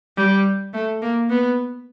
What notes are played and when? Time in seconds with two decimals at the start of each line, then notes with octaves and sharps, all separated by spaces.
0.17 G3
0.73 A3
1.02 A#3
1.30 B3